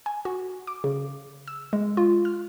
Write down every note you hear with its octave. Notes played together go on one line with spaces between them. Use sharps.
G#5
F#4
D6
C#3
E6
G#3
F4
F6